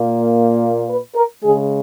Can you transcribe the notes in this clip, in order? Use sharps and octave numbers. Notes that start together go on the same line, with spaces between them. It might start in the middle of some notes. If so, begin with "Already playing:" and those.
Already playing: A#2 A#3
B4
A#4
C#3 G#3 G#4